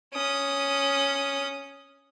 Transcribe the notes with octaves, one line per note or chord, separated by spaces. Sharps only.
C#4 D#6